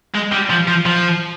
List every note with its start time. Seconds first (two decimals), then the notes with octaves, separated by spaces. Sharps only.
0.15 G#3
0.32 G3
0.50 F3
0.68 F3
0.86 F3